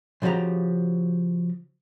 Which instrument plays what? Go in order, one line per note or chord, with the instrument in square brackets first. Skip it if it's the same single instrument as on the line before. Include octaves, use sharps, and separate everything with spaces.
[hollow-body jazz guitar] C#3 F3 F#4 G4 A#5